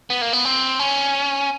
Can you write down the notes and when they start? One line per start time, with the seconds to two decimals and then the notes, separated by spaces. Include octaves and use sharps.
0.10 B3
0.21 A#3
0.33 B3
0.45 C4
0.79 C#4